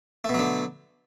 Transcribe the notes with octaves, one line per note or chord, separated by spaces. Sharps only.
B2 D3 F#3 A3